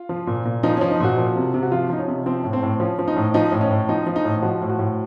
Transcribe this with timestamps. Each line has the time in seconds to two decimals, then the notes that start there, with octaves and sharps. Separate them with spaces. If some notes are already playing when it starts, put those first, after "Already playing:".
Already playing: F4
0.09 F3
0.27 A#2
0.45 A#2
0.63 F3 D#4
0.77 F3 C#4
0.91 D#4
1.00 A#2 F#4
1.18 F3
1.36 C3
1.54 C3
1.63 F#4
1.72 F3 F4
1.90 F3 D#4
1.99 C#4
2.08 C3
2.26 F3 C4
2.44 A2
2.53 C4
2.63 A2
2.80 F3 C#4
2.99 F3
3.08 D#4
3.17 A2
3.34 F3 D#4
3.52 A2
3.61 C#4
3.71 A2
3.89 F3 D#4
4.07 F3
4.16 D#4
4.25 A2
4.42 F3 F#4
4.61 A2
4.70 F#4
4.79 A2